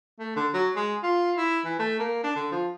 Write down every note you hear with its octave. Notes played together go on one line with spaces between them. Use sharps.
A3
D3
F#3
G#3
F4
E4
E3
A3
A#3
D4
D3
F3